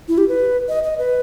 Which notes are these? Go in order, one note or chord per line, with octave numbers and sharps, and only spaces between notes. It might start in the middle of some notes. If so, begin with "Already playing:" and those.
E4
G4
B4
D#5
D#5
B4